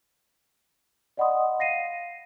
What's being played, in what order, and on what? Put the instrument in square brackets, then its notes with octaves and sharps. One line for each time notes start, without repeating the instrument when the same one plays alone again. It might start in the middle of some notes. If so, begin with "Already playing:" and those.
[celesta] D5 D#5 F#5 B5 C6 D#6
F5 A#6 C7 D#7